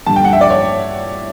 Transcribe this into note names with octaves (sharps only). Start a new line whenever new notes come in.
G2 D3 G3 A5
G5
F#5
E5
D5
C#5